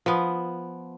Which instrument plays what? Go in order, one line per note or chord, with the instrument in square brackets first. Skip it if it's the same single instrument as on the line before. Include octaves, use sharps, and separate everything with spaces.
[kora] F3 B3